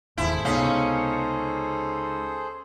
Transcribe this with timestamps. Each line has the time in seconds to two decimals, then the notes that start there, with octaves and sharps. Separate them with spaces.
0.18 E1 D#2 G#2 E4 G#4 A4 C5
0.45 C#2 C3 B3 C#4 D#4 F5